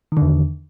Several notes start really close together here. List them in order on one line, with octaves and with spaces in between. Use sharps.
D#3 D3 E2